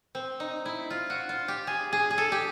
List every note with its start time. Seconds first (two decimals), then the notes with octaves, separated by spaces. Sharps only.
0.15 C4
0.40 D#4
0.65 E4
0.90 F4
1.10 F#4
1.29 F4
1.48 G4
1.67 G#4
1.93 G#4
2.11 G#4
2.18 A4
2.32 G4